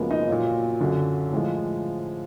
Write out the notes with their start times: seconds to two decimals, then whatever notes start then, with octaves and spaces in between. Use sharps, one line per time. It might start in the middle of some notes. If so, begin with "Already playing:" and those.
Already playing: F#2 C#3 F3 G#3 A#3 B3
0.11 D#4
0.28 A#2 F#3 F4
0.80 F#2 D3 F#3
1.32 A2 F3 G#3